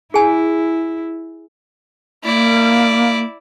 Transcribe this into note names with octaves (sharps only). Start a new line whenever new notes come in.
E4 G#4 G#5
A#3 E4 D5